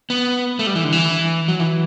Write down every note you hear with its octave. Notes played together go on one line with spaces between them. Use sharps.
B3
A3
G3
E3
D3
E3
F#3
E3